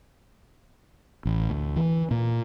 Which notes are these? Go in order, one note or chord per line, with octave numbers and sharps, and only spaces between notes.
A1
D2
E3
A#2